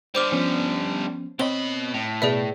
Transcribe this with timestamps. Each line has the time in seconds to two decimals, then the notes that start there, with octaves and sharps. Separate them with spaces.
0.15 D3 G3 C5 D6 F6
0.32 F3 B3 C#4
1.39 B2 C4 C#5 D#5 B5 G7
1.94 A2
2.22 B2 G#4 B4 D5 E5